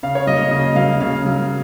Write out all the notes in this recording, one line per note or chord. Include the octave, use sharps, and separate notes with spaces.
C#3 F5
C#5
F#3 A#3 D#5
C#3 D#5
F#3 A#3 F5
C#3 F5
F#3 A#3